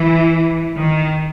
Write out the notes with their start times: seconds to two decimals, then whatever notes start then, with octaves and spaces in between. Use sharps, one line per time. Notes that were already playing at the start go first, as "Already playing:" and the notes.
Already playing: E3
0.77 D#3